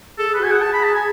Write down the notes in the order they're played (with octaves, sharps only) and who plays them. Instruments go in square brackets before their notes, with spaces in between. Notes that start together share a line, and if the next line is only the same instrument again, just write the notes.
[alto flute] G#4 [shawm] A4
[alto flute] G#4
[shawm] B4
[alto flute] F#4
[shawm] G#5
[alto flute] G#4 [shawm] F#5
[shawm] A5
B5
A5
G#5